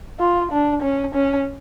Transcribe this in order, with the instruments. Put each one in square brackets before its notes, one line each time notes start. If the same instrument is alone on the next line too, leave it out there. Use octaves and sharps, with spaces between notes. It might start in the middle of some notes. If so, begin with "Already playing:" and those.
[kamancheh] F4
D4
C#4
C#4